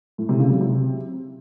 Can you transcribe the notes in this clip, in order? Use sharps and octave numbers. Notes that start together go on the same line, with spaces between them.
A2
C3
C#3
F#3
C3